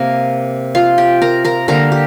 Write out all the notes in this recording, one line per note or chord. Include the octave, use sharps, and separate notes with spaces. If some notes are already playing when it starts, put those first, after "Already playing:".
Already playing: C3 A#3 A#4
F4 F5
G4 G5
A#4 A#5
A#4 A#5
D3 G3 A#3 A#4 A#5
G4